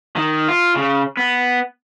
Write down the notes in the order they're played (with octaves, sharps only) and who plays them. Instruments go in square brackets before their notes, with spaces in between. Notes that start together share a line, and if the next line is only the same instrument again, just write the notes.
[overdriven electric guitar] D#3
F4
C#3
B3